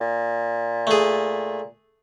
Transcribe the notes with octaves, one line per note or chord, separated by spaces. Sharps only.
A#2
A3 G#4